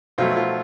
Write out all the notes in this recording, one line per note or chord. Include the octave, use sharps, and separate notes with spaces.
B1 B2 F3 F#3 A3 F4
F3 F4